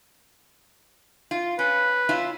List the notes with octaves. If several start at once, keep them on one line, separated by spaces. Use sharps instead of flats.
F4
C#4 B4
C#4 E4 F4